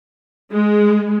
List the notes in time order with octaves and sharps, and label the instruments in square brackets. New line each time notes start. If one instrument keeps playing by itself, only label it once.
[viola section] G#3